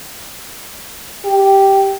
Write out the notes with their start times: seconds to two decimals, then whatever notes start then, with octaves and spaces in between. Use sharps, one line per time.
1.25 G4